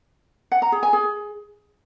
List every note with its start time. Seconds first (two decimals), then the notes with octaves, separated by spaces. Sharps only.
0.52 F#5
0.62 A#5
0.72 G#4
0.83 G#5
0.93 G#4